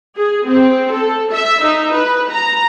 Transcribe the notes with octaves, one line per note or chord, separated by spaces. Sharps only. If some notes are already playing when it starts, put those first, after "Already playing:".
G#4
C4
A4
E5
D#4
B4
A#5